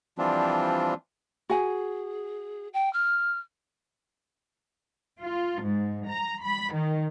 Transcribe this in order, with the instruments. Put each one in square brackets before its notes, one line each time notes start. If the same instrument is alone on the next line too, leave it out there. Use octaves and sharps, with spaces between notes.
[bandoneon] E3 F3 G3 C4 D4 F4
[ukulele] F#4 G#5 [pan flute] G#4
[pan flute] G5
F6
[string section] F4
G#2
A#5
B5
D#3